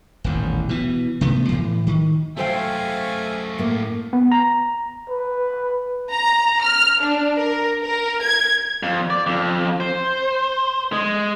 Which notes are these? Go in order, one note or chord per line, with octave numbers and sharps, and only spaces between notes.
D#1 A1 E2
B2 E3
C3 A3 B3
A2 E3
D#3
F#2 A3 A4 C5 E5 F5 G5 G#5
A2 A#3
B3
A#5
B4
A#5
F6
D4
A#4
A#4
G#6
F2
D5
F2
C5
G#3